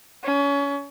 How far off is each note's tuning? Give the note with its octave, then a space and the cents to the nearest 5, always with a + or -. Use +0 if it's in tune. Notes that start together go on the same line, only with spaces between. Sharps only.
C#4 +30